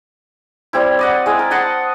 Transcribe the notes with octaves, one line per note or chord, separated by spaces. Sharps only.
G3 C4 E4
D5 D#5 F#5
G#3 E4
A#4
D#5 F#5 A5 C6